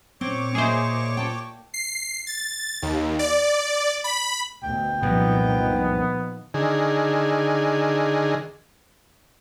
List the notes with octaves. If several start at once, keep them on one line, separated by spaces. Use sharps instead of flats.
A#2 C4 C#5 C#6 D6
A#3 G#4 C5 D#5 E5
G5 A5
C7
A6
D#2
D5
B5
D2 B2 G5
C2 F#2 A#2 D#3 F3 B3
D3 D#3 G#4